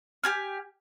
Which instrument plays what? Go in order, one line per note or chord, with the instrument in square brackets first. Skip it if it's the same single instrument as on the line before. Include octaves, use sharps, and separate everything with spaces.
[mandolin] G4 G#5 F6